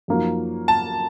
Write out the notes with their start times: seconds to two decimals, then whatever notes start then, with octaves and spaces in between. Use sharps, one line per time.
0.08 F#2 F3 A#3 D#4 F#4
0.68 A5